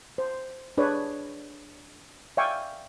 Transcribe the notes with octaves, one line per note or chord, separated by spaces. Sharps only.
C5
D4 G#4 B4 C#5 D5
D5 E5 F5 G5 G#5 C#6